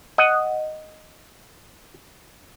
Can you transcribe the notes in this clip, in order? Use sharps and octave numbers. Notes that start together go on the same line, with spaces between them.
D#5 F#5